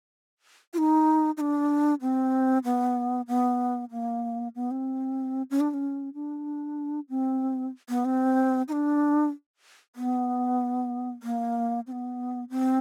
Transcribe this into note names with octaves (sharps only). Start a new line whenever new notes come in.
F4
D#4
D#4
D4
C4
B3
B3
A#3
B3
C4
C#4
D4
D4
C#4
D4
C4
B3
C4
D#4
D4
B3
A#3
C4
B3
C4